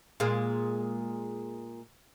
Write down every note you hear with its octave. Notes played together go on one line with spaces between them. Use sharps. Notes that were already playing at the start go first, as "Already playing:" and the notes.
A#2 G#3 A#3